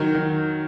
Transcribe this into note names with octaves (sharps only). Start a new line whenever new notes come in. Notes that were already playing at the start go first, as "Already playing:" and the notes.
Already playing: D#3 F#3
D#3